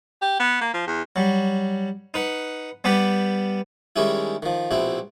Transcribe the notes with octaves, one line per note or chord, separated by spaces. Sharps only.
G4
B3
A#3
F3
E2
F#3 G3
D#4 B4 F#5
G3 B3 G4 B4
D#3 G3 G#3 C#4 D#4 E4
D#3 F3
A#1 B2 C4 E4